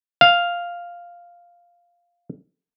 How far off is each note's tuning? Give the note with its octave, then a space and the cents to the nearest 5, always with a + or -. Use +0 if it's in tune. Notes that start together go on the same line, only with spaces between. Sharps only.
F5 +0